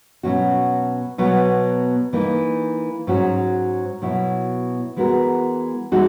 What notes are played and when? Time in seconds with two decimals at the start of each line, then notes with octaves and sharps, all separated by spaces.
0.23 B2 F#3 C#4 F#4
1.18 B2 F#3 B3
2.13 E3 A#3 D#4
3.07 G#2 F#3 C#4 F#4
4.02 B2 F#3 B3 E4
4.96 E3 G#3 B3 F#4 A#4
5.92 E3 G#3 D#4 F#4